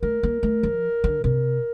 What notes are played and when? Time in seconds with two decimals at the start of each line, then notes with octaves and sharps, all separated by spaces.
0.03 A3 A#4
0.23 A#3
0.43 A3
0.63 F3
1.04 D3
1.24 C3 A#4